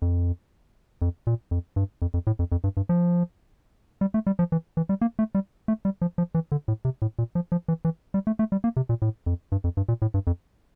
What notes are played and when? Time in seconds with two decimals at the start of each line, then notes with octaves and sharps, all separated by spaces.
0.02 F2
1.02 F2
1.27 A#2
1.51 F2
1.76 G2
2.02 F2
2.14 F2
2.27 A2
2.39 F2
2.52 F2
2.64 G2
2.77 G2
2.89 F3
4.01 G3
4.14 A3
4.27 G3
4.39 F3
4.52 E3
4.77 E3
4.89 G3
5.02 A#3
5.19 A3
5.35 G3
5.68 A3
5.85 G3
6.02 F3
6.18 F3
6.35 E3
6.52 D3
6.68 A2
6.85 C3
7.02 A2
7.19 A#2
7.35 F3
7.52 F3
7.68 E3
7.85 E3
8.14 G3
8.27 A3
8.39 A3
8.52 G3
8.64 A#3
8.77 C3
8.89 A#2
9.02 A2
9.26 F2
9.52 G2
9.64 F2
9.77 G2
9.89 A#2
10.02 A2
10.14 G2
10.27 F2